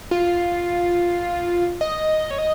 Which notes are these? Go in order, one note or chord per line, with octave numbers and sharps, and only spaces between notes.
F4
D#5
C#5
D#5